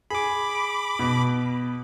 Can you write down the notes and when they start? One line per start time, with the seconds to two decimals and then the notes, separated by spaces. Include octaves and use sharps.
0.10 G#4 B5 D6
0.99 B2